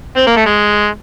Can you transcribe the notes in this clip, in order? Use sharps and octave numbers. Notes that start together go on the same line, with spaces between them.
C4
A#3
A3
G#3